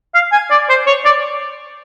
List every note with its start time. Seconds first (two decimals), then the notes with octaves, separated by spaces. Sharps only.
0.14 F5
0.32 G#5
0.51 D5
0.69 C5
0.86 C#5
1.05 D5